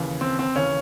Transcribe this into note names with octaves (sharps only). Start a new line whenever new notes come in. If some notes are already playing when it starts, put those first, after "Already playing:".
Already playing: D#2 C#3 E3
C4
C4
D#2 C#3 E3 C#4